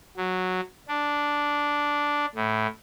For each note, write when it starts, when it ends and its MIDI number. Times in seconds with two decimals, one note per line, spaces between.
0.17 0.60 54
0.88 2.26 62
2.35 2.67 45